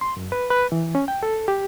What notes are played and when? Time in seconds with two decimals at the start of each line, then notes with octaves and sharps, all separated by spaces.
0.01 C6
0.17 F#2
0.32 B4
0.50 B4
0.72 E3
0.95 C#4
1.08 G5
1.23 A4
1.48 G4